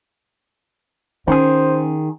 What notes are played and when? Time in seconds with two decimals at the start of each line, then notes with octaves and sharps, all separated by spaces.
1.28 D#3 C#4 G#4 C5